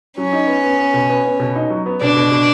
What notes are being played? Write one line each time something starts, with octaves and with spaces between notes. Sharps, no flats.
F#3 C#4
D#4
B3
B3
B3
B2
B3
B3
B2
D#4
F#3
B3
B2 D4
B2
B2